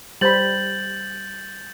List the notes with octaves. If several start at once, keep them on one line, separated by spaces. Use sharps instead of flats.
G3 C5 B5 G6 A6 F#7